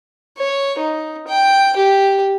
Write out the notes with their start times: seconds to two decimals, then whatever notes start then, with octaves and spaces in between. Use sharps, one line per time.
0.37 C#5
0.79 D#4
1.27 G5
1.76 G4